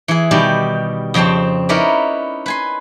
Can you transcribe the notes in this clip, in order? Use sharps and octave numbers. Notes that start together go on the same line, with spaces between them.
E3 G#4
B2 D#3 G3 G4
F2 C#3 C4 G5 A5
C#4 D#4 E4 A#4 B4 D5
B4 G#5 C6